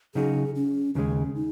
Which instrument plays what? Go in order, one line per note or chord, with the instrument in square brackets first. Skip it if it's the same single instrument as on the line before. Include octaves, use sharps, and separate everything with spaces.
[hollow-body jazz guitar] C#3 F#3 D#4 F#4 [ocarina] G#4
[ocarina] C#4
[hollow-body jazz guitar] D#2 C#3 G#3 [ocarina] C#4
[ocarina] D#4